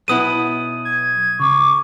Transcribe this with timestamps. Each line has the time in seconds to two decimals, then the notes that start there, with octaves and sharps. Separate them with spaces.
0.08 B1 B3 E4 D#6 D#7
0.85 G#6
1.40 C#3 C#6 D6